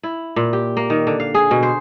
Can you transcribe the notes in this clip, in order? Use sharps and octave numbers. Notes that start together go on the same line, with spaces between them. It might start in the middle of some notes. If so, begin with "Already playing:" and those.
E4
A#2
G4
A#3
D#3
D3
F5
G#4
B2
C5